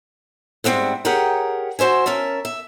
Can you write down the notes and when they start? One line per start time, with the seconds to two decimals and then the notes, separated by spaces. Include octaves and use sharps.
0.64 G#2 G3 C4 E5 F#5
1.05 G4 G#4 A#4 C#5 F#5 G5
1.79 F#4 C5 E5 G#5
2.06 C#4 A#4 E5 A5
2.45 E5